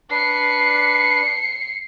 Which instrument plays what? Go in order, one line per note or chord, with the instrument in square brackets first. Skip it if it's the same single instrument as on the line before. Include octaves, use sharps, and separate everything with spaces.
[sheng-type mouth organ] D4 B4 [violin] C7 C#7